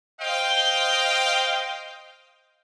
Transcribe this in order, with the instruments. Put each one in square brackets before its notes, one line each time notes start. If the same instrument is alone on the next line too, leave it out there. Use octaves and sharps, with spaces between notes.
[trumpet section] C5 D#5 F5 G5